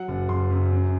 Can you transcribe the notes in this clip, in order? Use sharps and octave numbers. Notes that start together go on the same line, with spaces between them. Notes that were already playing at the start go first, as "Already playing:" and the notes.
Already playing: F#3 F#5
F#1
F#1 C6
F#2
F#2